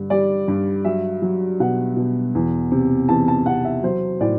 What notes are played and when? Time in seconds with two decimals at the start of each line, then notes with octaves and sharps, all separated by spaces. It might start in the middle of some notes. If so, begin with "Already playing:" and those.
Already playing: G2 D3
0.10 G3 D5
0.48 G2
0.85 F#3 E5
1.22 F#3
1.60 B2 F#5
1.96 B2
2.35 E2
2.71 C3
3.09 E2 A5
3.28 A5
3.46 C3 F#5
3.65 E5
3.83 F#3 C5
4.21 A2 D5